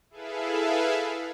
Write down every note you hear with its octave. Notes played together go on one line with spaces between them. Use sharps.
E4 G#4 A4 B4 E5 F5